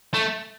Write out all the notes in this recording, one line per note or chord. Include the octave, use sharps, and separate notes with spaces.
A3